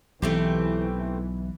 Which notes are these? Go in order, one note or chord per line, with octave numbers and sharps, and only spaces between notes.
B1 E3 A3 C4 G4